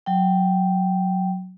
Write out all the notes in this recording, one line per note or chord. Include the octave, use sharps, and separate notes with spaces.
F#3 G5